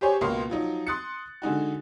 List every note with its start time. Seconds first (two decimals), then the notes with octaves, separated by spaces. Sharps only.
0.01 G4 G#4 C5 C#5 G#5
0.21 C#2 B2 A#3 F5 C6
0.50 F3 F#3 D#4
0.87 C6 D#6 F#6 A6 C#7
1.42 D3 G#3 D#4 F#4